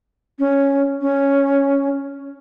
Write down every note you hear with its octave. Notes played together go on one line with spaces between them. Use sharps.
C#4
C#4